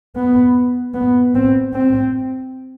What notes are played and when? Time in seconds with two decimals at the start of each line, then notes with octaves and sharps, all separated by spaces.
0.16 B3
0.94 B3
1.35 C4
1.73 C4